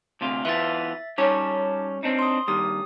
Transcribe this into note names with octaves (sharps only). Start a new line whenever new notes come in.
D2 C3 F4
E3 B3 F4 E5 A6
G3 C#4 D#4 C#5 A5 D6
C4 D4 D#4
C6 D#6
G2 D#3 A#3 G4 D#6